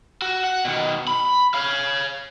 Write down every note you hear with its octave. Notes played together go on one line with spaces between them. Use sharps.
F#4
F#5
B2 D#3
B5
C#5 F5